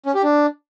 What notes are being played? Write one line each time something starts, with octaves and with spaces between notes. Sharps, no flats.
C#4
G4
D4